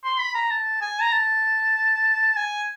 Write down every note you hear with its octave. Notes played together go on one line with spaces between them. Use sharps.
C6
B5
A#5
A5
G#5
A#5
A5
G#5